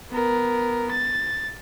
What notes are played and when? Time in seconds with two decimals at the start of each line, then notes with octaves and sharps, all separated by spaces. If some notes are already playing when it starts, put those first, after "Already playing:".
0.12 B3 A#4
0.91 A6